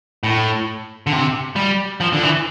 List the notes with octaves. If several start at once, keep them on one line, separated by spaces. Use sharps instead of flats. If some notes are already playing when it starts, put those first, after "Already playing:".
A2
D3
C3
G3
F3
D3
E3